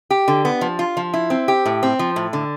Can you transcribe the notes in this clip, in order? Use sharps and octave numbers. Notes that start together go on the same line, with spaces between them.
G4
D3
B3
F3
F4
F3
E4
C4
G4
A2
C4
F3
A2
D3